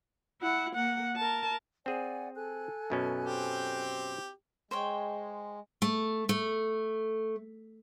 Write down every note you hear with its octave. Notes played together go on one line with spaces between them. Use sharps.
E4 F#5
A#3 F#5
A#4 A5
C4 G#4 D5 F#5 G#5
A4 G#5 F#6
F#2 B2 C#4
C4 G4
G#3 C5 C#5 G5
A3
A3